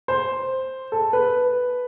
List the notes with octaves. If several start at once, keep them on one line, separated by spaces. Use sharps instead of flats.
C5
A4
B4